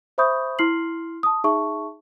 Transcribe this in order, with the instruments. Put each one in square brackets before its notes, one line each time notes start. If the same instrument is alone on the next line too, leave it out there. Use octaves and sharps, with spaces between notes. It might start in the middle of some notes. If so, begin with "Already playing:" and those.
[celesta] C5 E5 B5 C#6 D#6 G6
E4 C6 F6 C7 F#7
A5 D#6
D#4 G#4 E5 A5 C#6